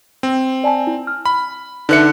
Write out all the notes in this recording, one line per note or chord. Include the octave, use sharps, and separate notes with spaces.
C4
D5 G#5 A5
E4
F6
B5
D3 D#4 B4 E5 F#6 C#7